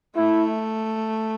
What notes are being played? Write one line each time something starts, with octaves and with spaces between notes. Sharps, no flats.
A3 E4